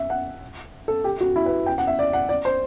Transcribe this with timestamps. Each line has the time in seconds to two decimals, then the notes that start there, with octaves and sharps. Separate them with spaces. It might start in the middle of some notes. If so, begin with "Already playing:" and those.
Already playing: E5
0.10 F#5
0.88 A4
1.04 G4
1.21 F#4
1.36 E4
1.46 B4
1.66 G5
1.78 F#5
1.87 E5
1.99 D5
2.13 F#5
2.29 D5
2.45 C5